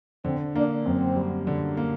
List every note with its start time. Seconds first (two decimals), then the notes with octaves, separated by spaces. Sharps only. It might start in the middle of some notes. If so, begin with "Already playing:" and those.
0.25 D3 C4
0.55 A#3 D4
0.85 F#2 C4
1.16 G3
1.47 D3
1.77 A#3